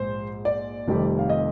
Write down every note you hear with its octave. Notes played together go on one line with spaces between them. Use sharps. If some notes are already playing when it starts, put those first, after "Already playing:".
Already playing: A#1 G#2 C5
D5
F1 F2 D#3 G3
F5
D#5